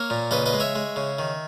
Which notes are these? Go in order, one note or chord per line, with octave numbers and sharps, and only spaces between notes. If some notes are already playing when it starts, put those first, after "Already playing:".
Already playing: A#3 A#4 C#5
A#2
C#3 B4 D#5
B4 D#5
G#3
C#5 E5
G#3
C#3
D#3